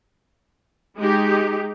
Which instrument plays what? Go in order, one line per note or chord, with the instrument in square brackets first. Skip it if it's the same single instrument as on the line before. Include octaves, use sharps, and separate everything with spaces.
[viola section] G#3 D#4 G4